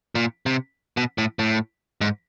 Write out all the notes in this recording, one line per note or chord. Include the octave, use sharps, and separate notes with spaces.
A#2
C3
B2
A2
A2
G#2